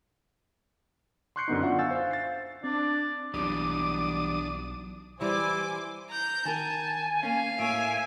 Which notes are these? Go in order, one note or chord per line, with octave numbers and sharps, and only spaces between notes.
C6 C#6 F#6 G6 C7 C#7
F#2 D3 B3 D#4
D4 F4 E5 F#5 C#6
F5 G#5 C#6 E6 G6 A6
C5 F5
A6 C7
C4 D4 D5
B1 E3 G3 D4 D6 D#6
E3 G3 E4 C5 G#5 D6
A#5 G6
D#3 A#4 G#5 A5
A#3 C#4 F5
A2 A#3 C#5 E5 G#5 D7